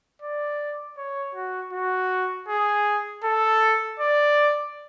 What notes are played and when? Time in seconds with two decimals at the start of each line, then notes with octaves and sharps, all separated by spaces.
0.22 D5
0.98 C#5
1.35 F#4
1.73 F#4
2.48 G#4
3.24 A4
3.99 D5